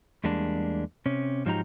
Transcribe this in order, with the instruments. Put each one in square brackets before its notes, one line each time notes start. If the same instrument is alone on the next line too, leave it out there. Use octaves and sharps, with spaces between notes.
[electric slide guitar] E2 G3 G#3 A#3 D4
C3 C#4
G#2 F3 F#3 D#4 G4 A#5